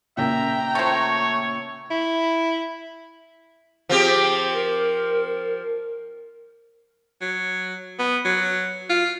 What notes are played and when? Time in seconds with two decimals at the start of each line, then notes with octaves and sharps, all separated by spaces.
0.17 A#2 C#3 A#3 E5 G5 A#5
0.75 F3 A3 C#5
1.90 E4
3.89 F3 C4 G4 G#4
4.52 A#4
7.21 F#3
7.99 B3
8.25 F#3
8.89 F4